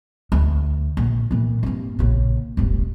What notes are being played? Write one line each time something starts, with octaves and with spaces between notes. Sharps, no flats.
D2
A#1
A#2 E3
G2 C4
A#1 C#3
D#1 G#1